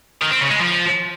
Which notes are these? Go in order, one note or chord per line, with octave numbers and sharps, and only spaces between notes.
D#3
C4
C#3
G#3
F3